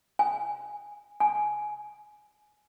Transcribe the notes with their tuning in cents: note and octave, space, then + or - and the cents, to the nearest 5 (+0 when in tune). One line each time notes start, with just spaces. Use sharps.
G#5 -15
G#5 +15